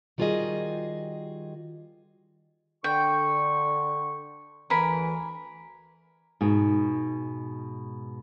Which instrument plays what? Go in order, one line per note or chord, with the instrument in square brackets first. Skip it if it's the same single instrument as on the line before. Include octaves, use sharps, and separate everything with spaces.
[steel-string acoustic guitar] D#3 G3 F4 F#4 G#4 D#5
[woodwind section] D3 C#6 [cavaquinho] G5
[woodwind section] D2 E3 [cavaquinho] A#4 G#5 B5
[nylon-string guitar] G#2 B2